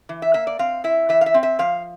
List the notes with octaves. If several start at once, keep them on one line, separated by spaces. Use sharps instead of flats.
E3
E5
A#3 E5
D5
C4 F5
E4 E5
E3 E5
F5
E5
C4
E5
F3 F5